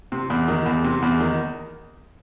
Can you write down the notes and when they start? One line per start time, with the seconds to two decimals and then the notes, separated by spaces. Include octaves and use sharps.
0.12 C3
0.30 E2
0.48 D#3
0.66 E2
0.84 C3
1.02 E2
1.21 D#3